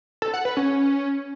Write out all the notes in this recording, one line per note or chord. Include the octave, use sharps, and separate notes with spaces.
A4
F#5
B4
C#4